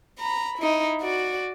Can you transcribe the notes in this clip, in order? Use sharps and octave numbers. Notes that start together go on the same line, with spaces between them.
A#5 B5
D#4 E4
F#4 D5